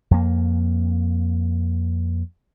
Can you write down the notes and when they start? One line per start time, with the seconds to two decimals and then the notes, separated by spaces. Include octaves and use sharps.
0.11 F2 A#3